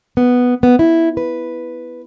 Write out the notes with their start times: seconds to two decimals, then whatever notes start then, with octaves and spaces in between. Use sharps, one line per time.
0.17 B3
0.63 B3
0.79 E4
1.17 B4